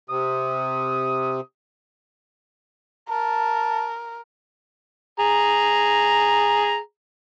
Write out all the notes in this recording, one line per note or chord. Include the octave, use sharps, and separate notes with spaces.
C3 D#6
A#4 A5
G#4 A#5